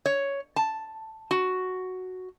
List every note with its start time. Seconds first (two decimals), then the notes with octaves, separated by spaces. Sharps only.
0.06 C#5
0.56 A5
1.31 F#4